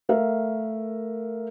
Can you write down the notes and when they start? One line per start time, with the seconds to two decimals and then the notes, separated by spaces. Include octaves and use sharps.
0.09 A3 A#4 E5 F5